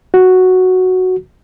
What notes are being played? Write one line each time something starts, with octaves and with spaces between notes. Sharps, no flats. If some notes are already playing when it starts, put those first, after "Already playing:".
F#4